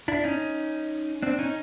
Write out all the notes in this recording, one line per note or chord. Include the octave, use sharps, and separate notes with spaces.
D4 E4
C#4 D#4
C4 D4
C#4 D#4